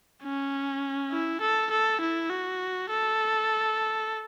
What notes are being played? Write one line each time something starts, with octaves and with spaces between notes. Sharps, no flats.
C#4
E4
A4
A4
E4
F#4
A4